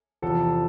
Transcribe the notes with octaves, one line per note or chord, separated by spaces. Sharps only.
E2 C3 F3 A4